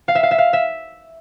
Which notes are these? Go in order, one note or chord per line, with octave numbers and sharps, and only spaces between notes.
F5
E5
F5
E5
F5
E5